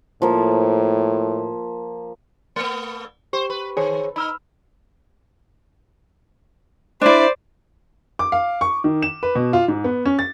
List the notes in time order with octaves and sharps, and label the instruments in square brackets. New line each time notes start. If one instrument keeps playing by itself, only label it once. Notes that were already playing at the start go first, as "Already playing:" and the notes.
[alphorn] A2 [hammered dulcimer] F3 A#3
[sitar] A3 B3
[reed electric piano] G4 C#6 [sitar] C5
[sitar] B4
[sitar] D#3 [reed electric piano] G#4 C5 C#5
[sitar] D#4 [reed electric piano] B5 E6 F6
[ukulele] D4 E4 [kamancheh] C5 D5
[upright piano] D6
F5
C#6
D#3
E7
B4
B2
F4
G#2
B3
C#4
A6